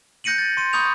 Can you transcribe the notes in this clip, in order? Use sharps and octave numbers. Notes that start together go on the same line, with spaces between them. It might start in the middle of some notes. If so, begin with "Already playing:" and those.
F#6 G6 A#6 C#7 D#7 F#7
A6
C6 D#7
B5 C#6 D#6 G6 F7